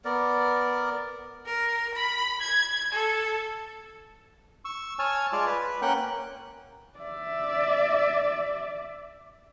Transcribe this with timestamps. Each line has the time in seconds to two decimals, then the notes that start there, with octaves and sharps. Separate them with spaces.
0.05 B3 A#4 D5
1.45 A#4
1.94 B5
2.41 G#6
2.92 A4
4.65 C#6 E6
4.99 C#5 G#5 A5 E6 F6
5.33 G#3 F4 D5 A5
5.47 B4
5.82 A#3 C#4 F#5 G5 F#6
6.99 D5 E5